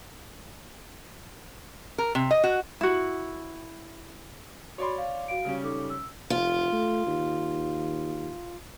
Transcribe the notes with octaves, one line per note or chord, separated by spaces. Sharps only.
A#4
C3
D#5
F#4
E4 F#4
F#4 C#5 D5 B5 C6
F5
F#4 F5 D7
C#3 G3 C#4
D#4 A4 D6
E6
F1 F4
A3
D#2